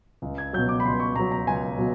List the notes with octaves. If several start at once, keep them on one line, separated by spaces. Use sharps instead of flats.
C#2
G#6
B2 F#3 G6
D6
B5
C#2 C6
C#6
B2 F#3 A#5
A#5
C#2 G#5
B2 F#3